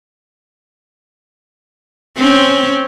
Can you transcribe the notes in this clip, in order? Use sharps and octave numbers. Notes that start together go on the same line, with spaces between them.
C4 C#4